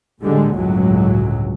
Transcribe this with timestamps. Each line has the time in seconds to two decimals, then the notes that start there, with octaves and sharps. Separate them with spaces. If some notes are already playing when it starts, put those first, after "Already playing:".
0.21 A2 D3 G3 G#3
0.54 G1 C#2 A2 F#3